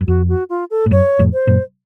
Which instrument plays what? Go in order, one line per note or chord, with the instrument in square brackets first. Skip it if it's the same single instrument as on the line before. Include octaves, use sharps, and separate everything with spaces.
[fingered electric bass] F#2
[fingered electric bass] F2 [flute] F#4
[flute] F#4
F4
A4
[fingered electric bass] A2
[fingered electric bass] F#2 [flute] C#5
[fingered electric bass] F2 A2
[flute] C5
[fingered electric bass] F#2 A#2